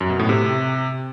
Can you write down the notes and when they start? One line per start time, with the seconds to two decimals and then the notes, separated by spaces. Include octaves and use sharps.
0.01 F#2
0.10 B2
0.19 A2
0.29 C3